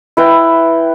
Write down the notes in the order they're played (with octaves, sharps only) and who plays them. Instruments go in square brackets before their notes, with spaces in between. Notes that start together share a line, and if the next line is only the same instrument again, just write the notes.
[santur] E4 B4 G5